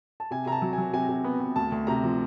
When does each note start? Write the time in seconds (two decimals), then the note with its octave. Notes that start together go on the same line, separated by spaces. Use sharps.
0.20 A5
0.31 C3 G#5
0.46 C3 A#5
0.52 A5
0.62 F#3
0.73 G#5
0.78 F#3
0.93 C3 G#5
1.09 C3
1.24 B3
1.40 B3
1.56 D2 A5
1.72 D2
1.87 C3 A#5
2.03 F3